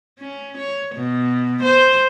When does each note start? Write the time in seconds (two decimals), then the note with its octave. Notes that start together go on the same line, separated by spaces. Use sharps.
0.19 C#4
0.57 C#5
0.95 B2
1.62 C5